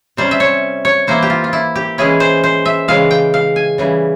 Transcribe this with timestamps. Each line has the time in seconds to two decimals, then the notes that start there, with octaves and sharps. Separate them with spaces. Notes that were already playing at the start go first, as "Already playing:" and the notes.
0.17 C3 G3 C#4 C5
0.31 E5
0.40 C#5
0.85 C#5
1.07 E3 A#3 E4 C5
1.22 G4
1.30 F4
1.44 F4
1.53 E4
1.76 G4
1.98 E3 G#3 C#4 E4 G#4
2.20 C5
2.44 C5
2.66 E5
2.88 C#3 E3 G#3 F5
3.11 G5
3.34 F5
3.56 G#5
3.78 C#3 E3 G3